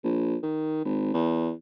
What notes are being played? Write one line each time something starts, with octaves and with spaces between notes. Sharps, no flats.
A#1
D#3
G#1
E2